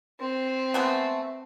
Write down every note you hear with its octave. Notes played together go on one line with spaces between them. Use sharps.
C4
G#3 A3 B3